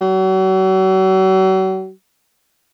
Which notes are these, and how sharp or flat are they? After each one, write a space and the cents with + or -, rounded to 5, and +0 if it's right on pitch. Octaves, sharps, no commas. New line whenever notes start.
F#3 +40